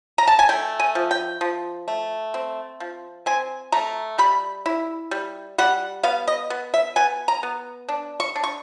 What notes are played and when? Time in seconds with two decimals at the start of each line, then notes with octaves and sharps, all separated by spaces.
0.18 A#5
0.27 A5
0.39 G#5
0.49 A3 G5
0.80 G#5
0.95 F3
1.11 G5
1.41 F3
1.88 A3
2.34 C4
2.80 F3
3.26 C4 G#5
3.72 A3 A#5
4.18 G3 B5
4.66 E4
5.11 G3
5.58 G3 F#5
6.03 B3 F5
6.27 D#5
6.50 B3
6.74 E5
6.96 B3 G#5
7.28 A#5
7.43 B3
7.89 D4
8.20 C#6
8.36 D4
8.44 C#6